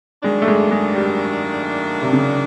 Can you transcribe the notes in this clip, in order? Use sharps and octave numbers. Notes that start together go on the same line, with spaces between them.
D#3 F#3 G#3 A#3 D4
A3
G#3
G#3
G3
C3
C#3